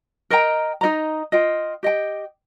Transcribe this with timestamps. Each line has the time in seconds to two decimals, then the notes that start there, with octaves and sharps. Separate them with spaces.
0.30 A#4 D#5 G5 A#5
0.81 D#4 A#4 D#5 A#5
1.32 F4 D#5 G5
1.83 G4 D#5 G5